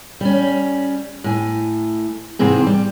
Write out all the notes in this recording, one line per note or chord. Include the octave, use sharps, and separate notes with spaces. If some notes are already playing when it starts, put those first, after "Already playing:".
G3 C#4
A2 G#5
G#2 C3 E3 C4 G#4
G3